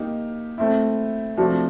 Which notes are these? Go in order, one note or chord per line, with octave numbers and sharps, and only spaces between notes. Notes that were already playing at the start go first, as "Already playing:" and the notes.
Already playing: A#3 D#4 G4
A3 C4 E4
C3 F3 A3 D4 F#4